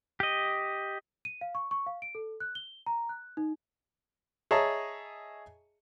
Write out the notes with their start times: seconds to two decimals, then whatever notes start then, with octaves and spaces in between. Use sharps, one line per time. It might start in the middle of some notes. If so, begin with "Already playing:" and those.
0.20 G4 D#5
1.25 D#7
1.41 F5
1.55 C#6
1.71 C#6
1.87 F5
2.02 D7
2.15 A4
2.40 F#6
2.55 G7
2.86 A#5
3.09 F#6
3.37 D#4
4.51 G#4 C#5 D#5 E5 A5 A#5